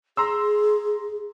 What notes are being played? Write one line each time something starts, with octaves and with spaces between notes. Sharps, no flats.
G#4 A#5 C6 E6